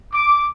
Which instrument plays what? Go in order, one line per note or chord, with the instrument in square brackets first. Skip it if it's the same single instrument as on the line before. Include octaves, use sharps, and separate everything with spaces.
[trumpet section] D6